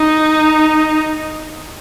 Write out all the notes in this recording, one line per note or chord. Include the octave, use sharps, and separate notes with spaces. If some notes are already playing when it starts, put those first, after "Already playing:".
Already playing: D#4